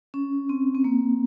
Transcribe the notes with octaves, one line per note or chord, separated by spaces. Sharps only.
C#4
C4
C4
A#3